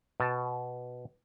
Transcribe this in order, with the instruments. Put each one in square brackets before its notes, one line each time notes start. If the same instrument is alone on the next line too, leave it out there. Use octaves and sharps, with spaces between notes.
[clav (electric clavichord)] B2 A5